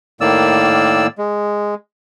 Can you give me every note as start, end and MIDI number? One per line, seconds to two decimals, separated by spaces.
0.21 1.07 45
0.21 1.07 51
0.21 1.07 58
0.21 1.07 74
0.21 1.07 88
1.18 1.75 56